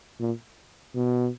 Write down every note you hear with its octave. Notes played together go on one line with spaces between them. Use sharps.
A#2
B2